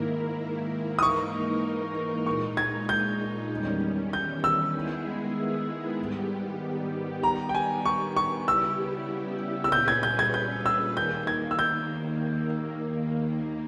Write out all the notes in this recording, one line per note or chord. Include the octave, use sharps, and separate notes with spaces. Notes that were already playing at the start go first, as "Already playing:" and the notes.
Already playing: G#2 D#3 A#3 E4 A#4
D#6
G#2 E3 A#3 D#4 A#4 C#6
A#2 G#3 D#4 C#6
G#6
G6
E2 D#3 G3 C#4
G6
E6
D#3 G#3 B3 E4 G#4
G#2 D#3 G3 B3 G4
D#3 G3 B3 A#5
G5
G#5
C#6
C#6
C#3 G3 B3 E4 G4 E6
E6
A#2 G3 C#4 G#4 B4 G6
G#6
G6
G#6
G6
E6
D#2 D#3 A#3 G6
G#6
E6
G6